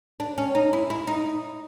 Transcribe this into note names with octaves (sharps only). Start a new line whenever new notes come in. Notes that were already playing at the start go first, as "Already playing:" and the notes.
D4
C#4
D#4
E4
E4
D#4